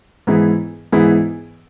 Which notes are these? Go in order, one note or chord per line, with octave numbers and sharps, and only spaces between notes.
G#2 E3 B3 E4 G#4
G#2 E3 B3 E4 G#4